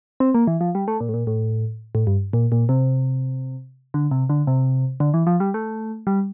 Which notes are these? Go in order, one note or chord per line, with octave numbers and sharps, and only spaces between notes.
C4
A#3
E3
F3
G3
A3
A#2
A2
A#2
A2
A2
G2
A#2
A#2
C3
D3
C3
D3
C3
D3
E3
F3
G3
A3
G3